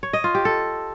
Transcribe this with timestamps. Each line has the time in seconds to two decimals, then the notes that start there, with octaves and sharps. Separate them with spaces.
0.03 C#5
0.13 D#5
0.24 F4
0.35 G4
0.45 A4